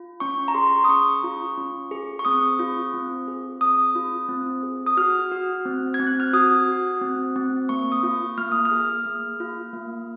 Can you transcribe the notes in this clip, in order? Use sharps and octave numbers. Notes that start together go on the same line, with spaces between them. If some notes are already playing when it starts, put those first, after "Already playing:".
Already playing: F4
C#4 C#6
A#5
G#4 C6
D#6
C#4 C#6
F4
C#4
G#4
C#6
C4 D#6
F4
C4
G#4
C4 D#6
F4
C4
G#4
D#6
F#4 F6
F#4
C4
G#6
C4
F#6
F6
F#4 D#6
F#4
C4
C4
A#3 C#6
D#6
F4
A#3 F6
D#6
F6
G#4
A#3
F4
A#3